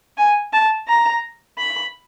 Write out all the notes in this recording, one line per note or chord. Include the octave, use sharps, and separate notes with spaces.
G#5
A5
A#5
B5